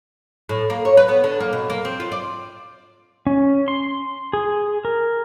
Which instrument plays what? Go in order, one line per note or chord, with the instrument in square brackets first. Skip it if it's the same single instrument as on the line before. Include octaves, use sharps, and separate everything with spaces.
[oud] A2
A#3
C#5
B4
B3
D3
A#3
B2
A#3
C4
F4
D5
[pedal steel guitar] C#4
C6
G#4
A#4